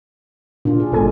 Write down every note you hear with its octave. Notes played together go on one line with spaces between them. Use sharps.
A#2 D4 F4
G#4
G#1 B2 G#3 A4 G#5